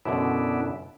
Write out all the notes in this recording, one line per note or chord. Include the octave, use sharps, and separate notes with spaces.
F#2 B2 D3 B3 D4 E4